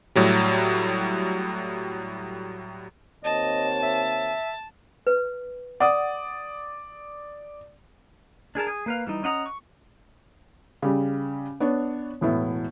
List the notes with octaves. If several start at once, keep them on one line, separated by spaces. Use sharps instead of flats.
A2 F#3 G3
D#2 C4 C#5 D#5 A5
E5
B4
D5 F#5 D#6
D4 G#4 A#4 A5
G#4
A#3 B4 F5
E3 G3 D#4
C#4 D#5 F#5 A#5 D#6
C#6
C#3 G3
B3 D4 C#5
E1 A2 B3 E4